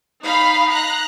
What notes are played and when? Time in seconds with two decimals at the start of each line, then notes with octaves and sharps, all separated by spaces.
0.23 D#4 F5 B5
0.71 A#5 F#6